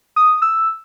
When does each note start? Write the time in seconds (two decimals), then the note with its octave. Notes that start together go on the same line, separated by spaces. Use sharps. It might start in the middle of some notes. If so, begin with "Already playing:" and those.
0.16 D#6
0.42 E6